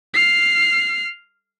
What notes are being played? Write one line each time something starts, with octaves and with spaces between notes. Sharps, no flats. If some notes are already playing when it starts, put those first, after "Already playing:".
F6 C7